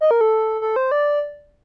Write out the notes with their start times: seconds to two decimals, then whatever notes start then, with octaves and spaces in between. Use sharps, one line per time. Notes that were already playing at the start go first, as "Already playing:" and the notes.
0.01 D#5
0.11 A#4
0.21 A4
0.61 A4
0.76 C5
0.91 D5